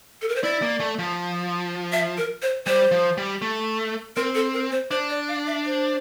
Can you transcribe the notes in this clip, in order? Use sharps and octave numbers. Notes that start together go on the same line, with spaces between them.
A4
A#4
C5
E4 D5
A#3
A3
F3
E5
A#4
C5
G3 C5
F3
G3
A3
C4 A#4
A4
A#4
C5
D4 C5
D5
F5
E5
C5